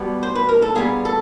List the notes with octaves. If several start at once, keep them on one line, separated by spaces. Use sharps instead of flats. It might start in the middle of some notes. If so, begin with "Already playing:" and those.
Already playing: B2 G3 B3
C5
B4
A#4
A4
A#2 G3 B3 G#4
A4